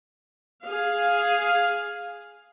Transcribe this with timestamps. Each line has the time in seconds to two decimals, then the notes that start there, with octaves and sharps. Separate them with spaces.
0.65 G#4 F5